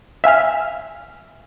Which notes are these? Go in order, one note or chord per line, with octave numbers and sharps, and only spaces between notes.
E5 F5 G#5 F6